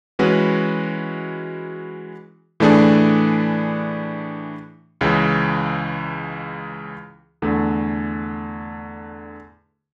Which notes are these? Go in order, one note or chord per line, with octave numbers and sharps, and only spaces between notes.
E3 G#3 C#4 F#4 B4
A2 E3 A3 D4 G#4
C#2 C#3 E3 G#3
E2 D3 A3